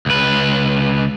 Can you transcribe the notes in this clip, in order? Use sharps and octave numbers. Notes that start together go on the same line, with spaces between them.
C#2 B4